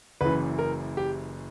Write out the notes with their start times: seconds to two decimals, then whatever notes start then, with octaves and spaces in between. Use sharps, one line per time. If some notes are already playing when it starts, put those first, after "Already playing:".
0.21 F#1 F#2 E3 B4
0.59 A#4
0.97 G4